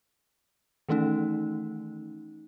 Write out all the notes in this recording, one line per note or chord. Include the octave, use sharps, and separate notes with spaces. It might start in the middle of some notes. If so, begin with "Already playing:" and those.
D#3 E3 A3 C#4 D#4